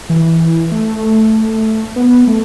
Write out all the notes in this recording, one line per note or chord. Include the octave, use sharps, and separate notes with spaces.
E3
A3
B3
A3